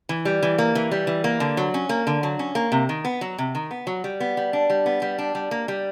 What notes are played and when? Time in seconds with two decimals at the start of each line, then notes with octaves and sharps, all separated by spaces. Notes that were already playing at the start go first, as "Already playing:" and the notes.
0.09 E3
0.25 G3
0.43 E3
0.58 A#3
0.75 E3
0.91 G3
1.07 E3
1.24 A#3
1.40 D3
1.57 F#3
1.74 C#4
1.89 A#3
2.07 D3
2.23 F#3
2.39 C#4
2.55 A#3
2.72 C3
2.89 D#3
3.05 B3
3.21 F#3
3.38 C3
3.55 D#3
3.71 B3
3.87 F#3
4.04 G3
4.20 B3
4.37 G3
4.53 D4
4.70 G3
4.86 B3
5.02 G3
5.18 D4
5.35 G3
5.51 A#3
5.68 G3